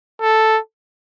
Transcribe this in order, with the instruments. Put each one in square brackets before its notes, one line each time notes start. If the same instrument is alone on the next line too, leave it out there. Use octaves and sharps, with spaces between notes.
[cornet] A4